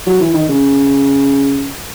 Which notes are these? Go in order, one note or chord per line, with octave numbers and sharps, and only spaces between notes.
F#3
E3
D#3
C#3